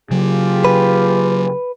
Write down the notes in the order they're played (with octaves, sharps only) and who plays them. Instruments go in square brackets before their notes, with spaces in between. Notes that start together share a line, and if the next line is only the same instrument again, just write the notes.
[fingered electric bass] C#3 F#3 [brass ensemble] F4 G4 G#4
[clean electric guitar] B4